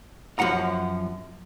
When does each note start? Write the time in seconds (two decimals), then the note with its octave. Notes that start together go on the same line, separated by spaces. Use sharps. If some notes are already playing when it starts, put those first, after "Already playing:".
0.39 F#2 F3 F#5 A#5